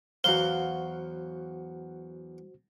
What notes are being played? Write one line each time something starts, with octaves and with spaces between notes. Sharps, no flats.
E2 F#3 F#4 C5 F5 G7